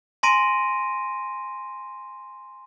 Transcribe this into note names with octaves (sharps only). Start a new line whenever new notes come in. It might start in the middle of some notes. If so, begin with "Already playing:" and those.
G#5 A#5 C6 A#6 D7 D#7